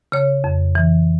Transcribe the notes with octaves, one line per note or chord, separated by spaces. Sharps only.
C#3 C#5
F2
E3